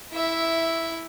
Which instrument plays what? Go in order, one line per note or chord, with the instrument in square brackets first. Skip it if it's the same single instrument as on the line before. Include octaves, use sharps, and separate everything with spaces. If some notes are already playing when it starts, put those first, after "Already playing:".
[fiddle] E4 E5